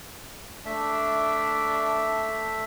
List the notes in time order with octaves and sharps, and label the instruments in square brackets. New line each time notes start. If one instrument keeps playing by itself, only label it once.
[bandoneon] A3 E5 [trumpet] D4